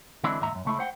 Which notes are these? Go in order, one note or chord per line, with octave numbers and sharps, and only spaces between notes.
D3 E3 G#3 C4 D4 E4
D#2 G#2 E5 A#5
C#2 F#2
C#2 A3 E4
C5 F#5 G5